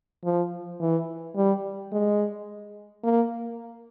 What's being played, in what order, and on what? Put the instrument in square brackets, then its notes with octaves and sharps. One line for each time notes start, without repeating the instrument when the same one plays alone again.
[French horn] F3
E3
G3
G#3
A#3